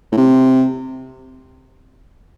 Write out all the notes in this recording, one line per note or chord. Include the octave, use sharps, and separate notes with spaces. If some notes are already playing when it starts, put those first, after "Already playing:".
A2
C3